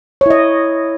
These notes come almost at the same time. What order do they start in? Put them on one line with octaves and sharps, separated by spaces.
C#5 E4 D#5